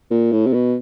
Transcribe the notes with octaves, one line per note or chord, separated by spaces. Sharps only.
A#2
A2
C3
B2